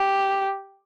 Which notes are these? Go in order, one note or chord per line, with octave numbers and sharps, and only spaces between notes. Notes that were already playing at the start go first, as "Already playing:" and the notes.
Already playing: G4